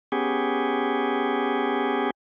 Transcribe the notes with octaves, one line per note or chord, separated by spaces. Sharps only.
B3 C#4 G4 G#4